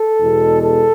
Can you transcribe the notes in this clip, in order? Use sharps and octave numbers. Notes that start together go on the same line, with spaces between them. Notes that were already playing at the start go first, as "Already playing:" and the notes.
Already playing: A4
E2 B2 G#3
A4